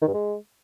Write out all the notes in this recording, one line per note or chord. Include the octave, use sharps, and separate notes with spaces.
D#3
G2
G#3